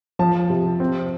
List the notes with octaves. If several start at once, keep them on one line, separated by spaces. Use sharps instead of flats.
F3 A5
C3
C4